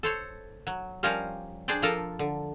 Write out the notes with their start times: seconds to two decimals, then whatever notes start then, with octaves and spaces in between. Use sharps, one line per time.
0.03 A4 C5 C#5
0.67 F#3
1.03 F3 G3 C#4 A#4 C5 F5
1.68 D4 G#4 C5 D5 G5
1.82 F3 F4 A4 A#4 A5
2.19 D3